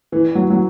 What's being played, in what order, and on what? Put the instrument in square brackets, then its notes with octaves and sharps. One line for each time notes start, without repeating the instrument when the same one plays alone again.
[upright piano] E3
F#3
F#3